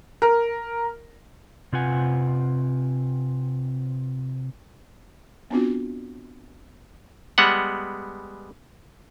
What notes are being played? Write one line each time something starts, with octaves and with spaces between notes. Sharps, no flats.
A#4
C3 C4 F4 B4 F#5 G#5
B3 C4 D4 F4 F#4
G3 G#3 B3 F#5